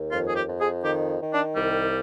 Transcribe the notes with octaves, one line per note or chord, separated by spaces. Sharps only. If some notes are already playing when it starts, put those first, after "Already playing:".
Already playing: D#2
F2 F4
G#4
G4
F2
G#4
D#3 G4
D#3
D4
C2 G3